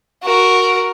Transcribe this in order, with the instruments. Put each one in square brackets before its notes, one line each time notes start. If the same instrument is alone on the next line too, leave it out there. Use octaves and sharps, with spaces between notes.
[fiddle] F#4 A#4